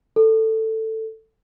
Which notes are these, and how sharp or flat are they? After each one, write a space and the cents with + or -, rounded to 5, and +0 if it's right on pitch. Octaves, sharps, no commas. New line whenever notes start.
A4 +10